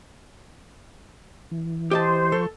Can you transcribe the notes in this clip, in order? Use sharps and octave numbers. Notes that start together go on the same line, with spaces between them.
E3
G4 C5 D#5 A5
F3 A4 C#6